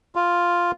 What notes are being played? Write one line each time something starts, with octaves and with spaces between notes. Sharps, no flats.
F4